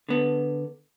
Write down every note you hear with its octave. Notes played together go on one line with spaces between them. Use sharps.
D3 B3